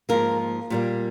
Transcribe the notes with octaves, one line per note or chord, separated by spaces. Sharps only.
G#2 F3 A#3 A#4
A#2 G3 A#3